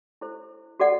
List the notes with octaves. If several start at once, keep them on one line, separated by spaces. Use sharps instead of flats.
E4 A4 C5
F#4 A4 D5 F#5